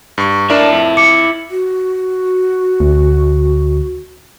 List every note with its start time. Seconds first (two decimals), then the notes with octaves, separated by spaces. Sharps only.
0.18 G2 C#6
0.50 D4 E4 A#4 D5 A5
0.73 F2
0.97 D6 C#7
1.50 F#4
2.80 D2